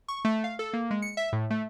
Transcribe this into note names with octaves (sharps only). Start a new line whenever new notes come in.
C#6
A3
F5
A4
A#3
G#3
C#7
E5
A2
A3